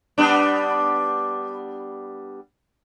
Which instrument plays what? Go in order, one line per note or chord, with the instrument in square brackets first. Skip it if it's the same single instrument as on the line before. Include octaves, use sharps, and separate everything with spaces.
[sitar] G3 B3 D4